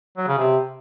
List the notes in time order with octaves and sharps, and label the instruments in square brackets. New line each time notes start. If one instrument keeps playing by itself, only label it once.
[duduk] F#3
C#3
C3